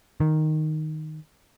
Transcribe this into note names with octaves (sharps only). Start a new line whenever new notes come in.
D#3